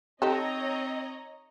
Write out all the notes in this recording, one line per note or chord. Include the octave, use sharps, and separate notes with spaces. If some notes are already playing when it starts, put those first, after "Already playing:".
C4 D#4 G4 A4 C#5 D#5 A#5